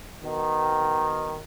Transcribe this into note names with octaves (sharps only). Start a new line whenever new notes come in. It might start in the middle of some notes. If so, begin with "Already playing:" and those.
B2 D#3